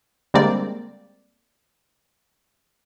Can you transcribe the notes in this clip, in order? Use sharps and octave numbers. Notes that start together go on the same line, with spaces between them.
D3 G3 G#3 A#3 C4 D5